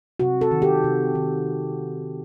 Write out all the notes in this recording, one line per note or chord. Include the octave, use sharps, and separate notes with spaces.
C3 F#4
A4
D#3
G4
C3
D#3